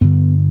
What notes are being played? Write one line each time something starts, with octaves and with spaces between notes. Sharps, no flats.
G2 D3 B3